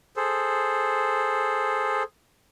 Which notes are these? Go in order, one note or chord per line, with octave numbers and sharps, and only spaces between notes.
G#4 A4 C5